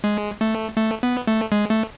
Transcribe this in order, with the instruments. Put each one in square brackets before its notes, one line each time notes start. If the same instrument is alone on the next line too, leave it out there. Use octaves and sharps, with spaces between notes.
[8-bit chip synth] G#3
A3
A3
B3
A3
G#3
A3